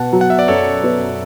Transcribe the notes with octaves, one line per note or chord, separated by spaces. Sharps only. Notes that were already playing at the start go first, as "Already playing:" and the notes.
Already playing: B2 F#5 A5
F#3
F#5
E5
D5
F#2 A4 C#5
B3